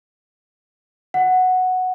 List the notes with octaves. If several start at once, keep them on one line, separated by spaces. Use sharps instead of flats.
F#5